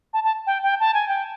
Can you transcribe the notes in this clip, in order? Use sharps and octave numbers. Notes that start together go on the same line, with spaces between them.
A5
A5
G5
G5
A5
G#5
G5